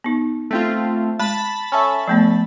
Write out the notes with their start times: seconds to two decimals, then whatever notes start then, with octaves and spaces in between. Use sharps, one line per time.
0.04 B3 D#4
0.51 A3 C4 F4
1.19 G#3 A5 B5 A6
1.72 C#4 A4 E5
2.08 F3 A3 B3